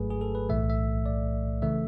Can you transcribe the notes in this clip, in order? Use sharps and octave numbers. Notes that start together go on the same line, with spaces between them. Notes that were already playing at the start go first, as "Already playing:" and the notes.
Already playing: G#1 G#2 F#3 A3 G#4 B4
G#4
A4
B4
B1 A2 E3 A3 E5
E5
D5
C#3 E3 A3 E5